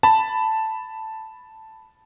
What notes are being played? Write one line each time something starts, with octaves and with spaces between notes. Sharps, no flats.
A5 B5